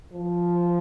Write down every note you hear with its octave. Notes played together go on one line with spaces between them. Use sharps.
F3